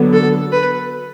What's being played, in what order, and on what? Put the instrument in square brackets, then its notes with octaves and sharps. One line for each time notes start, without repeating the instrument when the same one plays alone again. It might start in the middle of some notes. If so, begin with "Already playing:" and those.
Already playing: [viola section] D3 F#3 B3
[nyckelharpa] A4
B4